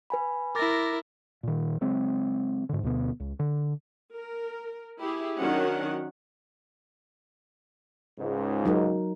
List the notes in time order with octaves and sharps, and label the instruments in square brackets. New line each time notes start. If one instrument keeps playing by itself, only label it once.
[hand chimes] B4 G#5 B5
[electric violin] E4 A#4 [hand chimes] D6 A6 A#6
[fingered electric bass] A#2 D#3
C#3 F#3 G#3 C4
G#2 D3
D2 B2 B3
C#2
D3
[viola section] A#4
E4 G4 G#4
D#3 F#3 C#4 D4 F#5
[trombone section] C#2 G#2
[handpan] F#3 D#4 A#4